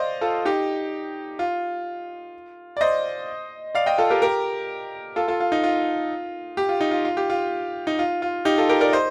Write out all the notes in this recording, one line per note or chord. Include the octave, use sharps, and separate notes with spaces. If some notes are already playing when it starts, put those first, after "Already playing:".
Already playing: C5 D5 D#5 F5
F4 A4
D#4 G4
F4
D5
C5 D#5
D5 F5
D#5 G5
F4 A4
G4 A#4
G4 A#4
F4 A4
F4 A4
F4
D#4
F4
G4
F4
D#4
F4
F4
G4
F4
D#4
F4
F4
D#4 G4
F4 A4
G4 A#4
A#4 D5
C5 D#5